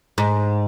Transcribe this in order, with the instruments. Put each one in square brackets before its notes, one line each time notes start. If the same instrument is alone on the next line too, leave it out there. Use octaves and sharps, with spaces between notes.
[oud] G#2